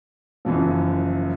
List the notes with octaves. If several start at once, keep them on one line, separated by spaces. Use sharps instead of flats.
F#1 F#2 E3 F3